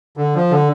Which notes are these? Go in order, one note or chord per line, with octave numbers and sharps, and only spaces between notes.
D3
F3
D3